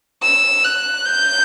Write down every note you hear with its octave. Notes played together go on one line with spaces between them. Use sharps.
E6
F#6
G6